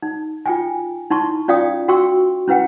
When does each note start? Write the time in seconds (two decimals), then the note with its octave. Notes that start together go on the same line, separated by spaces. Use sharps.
0.02 D#4
0.46 F4 G5 G#5
1.10 D#4 E4 A5 C6 C#6
1.48 C#4 F4 D5 F5 G5 D#6
1.88 F#4 G5 C6 C#6 E6
2.48 C#4 E4 B4 F#5 G5